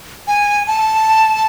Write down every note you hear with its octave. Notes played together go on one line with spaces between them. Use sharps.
G#5
A5